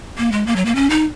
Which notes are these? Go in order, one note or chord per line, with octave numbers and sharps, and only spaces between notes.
A#3
G#3
A#3
F#3
A#3
C#4
D#4